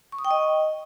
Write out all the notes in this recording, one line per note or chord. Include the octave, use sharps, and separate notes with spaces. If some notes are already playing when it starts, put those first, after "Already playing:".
C#6
D#6
G5
D#5